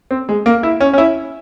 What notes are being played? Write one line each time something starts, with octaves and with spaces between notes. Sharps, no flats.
C4
G#3
A#3
E4
C#4
C#4
E4